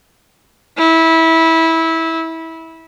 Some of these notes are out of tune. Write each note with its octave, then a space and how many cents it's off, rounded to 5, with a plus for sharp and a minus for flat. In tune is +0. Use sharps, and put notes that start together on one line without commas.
E4 -20